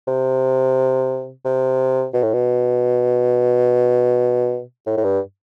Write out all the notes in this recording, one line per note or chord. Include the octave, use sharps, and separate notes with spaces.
C3
C3
B2
A2
B2
A2
A2
G2